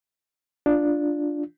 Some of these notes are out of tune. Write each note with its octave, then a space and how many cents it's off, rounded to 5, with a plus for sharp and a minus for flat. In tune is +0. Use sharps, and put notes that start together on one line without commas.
D4 +0 F4 +0